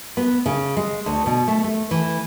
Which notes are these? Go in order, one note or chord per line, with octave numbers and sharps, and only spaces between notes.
B3
C#3
G#3
D2
B2
A3
A3
E3